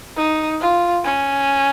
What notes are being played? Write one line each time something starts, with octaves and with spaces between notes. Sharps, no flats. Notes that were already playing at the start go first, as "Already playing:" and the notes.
D#4
F4
C#4